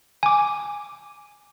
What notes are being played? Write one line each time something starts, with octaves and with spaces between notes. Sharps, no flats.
G#5 D6